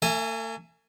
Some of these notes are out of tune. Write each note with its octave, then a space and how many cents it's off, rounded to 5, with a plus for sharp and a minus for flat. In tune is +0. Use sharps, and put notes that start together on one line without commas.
A3 +45 E5 +0 G#5 +0